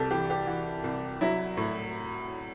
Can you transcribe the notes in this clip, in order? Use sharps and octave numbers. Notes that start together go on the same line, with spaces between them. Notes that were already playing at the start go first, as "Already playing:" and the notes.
Already playing: C2 G4 A4
E3 G4
G4
E3 F#4
C2
F#3 E4
A2